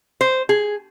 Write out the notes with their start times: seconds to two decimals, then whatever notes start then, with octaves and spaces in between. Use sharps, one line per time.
0.21 C5
0.49 G#4